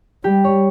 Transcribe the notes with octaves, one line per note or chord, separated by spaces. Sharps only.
G3 G4
C#5